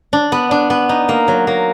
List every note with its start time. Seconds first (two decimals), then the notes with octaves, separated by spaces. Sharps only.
0.13 D4
0.32 B3
0.51 D4
0.70 B3
0.89 D#4
1.09 A#3
1.28 F#3
1.47 A#3